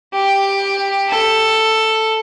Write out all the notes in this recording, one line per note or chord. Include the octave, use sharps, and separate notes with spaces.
G4
A4